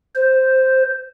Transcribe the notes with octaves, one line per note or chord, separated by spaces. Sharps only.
C5